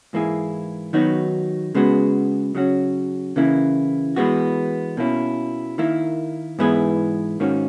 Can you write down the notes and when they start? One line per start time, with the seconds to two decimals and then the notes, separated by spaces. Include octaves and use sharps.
0.13 G#2 E3 A#3 E4 G#4
0.93 D#3 F#3 B3 D#4 F#4
1.75 C#3 G#3 B3 F#4
2.55 C#3 F#3 C#4 F#4
3.36 C#3 E3 A#3 E4
4.16 E3 G#3 B3 F#4
4.97 B2 A#3 C#4 E4
5.78 D#3 A#3 E4
6.59 G#2 E3 B3 E4 G#4
7.40 G#2 D#3 A#3 C#4 F#4